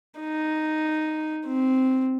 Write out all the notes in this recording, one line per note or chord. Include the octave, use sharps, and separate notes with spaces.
D#4
C4